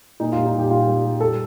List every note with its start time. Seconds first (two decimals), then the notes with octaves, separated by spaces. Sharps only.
0.20 A#2 D#4
0.32 F4
0.37 G3
0.46 D#4
0.53 A#2
0.58 G4
0.70 G3 F4
0.87 G3
1.04 G3
1.21 G3 A4